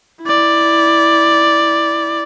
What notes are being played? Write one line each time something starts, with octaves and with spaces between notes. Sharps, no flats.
E4 D5